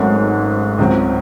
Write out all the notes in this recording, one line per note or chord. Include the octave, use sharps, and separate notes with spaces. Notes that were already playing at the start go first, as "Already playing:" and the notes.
Already playing: G#1 G#2 F#3 A3 C#4
C#2 C#3 F#3 C4